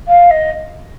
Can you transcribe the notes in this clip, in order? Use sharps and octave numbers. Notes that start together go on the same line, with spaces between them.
F5
D#5